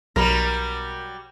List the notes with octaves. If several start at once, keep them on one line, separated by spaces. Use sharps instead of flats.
B1 F#3 G3 A#4 B5